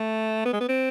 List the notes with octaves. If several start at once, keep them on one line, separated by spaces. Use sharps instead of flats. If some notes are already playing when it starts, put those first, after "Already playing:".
Already playing: A3
B3
G#3
B3
C4